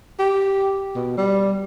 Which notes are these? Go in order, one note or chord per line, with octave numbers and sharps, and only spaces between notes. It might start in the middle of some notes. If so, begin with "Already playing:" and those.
G4
B2
G3